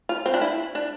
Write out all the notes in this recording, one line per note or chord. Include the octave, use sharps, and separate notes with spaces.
F4
C4
D4
E4
D4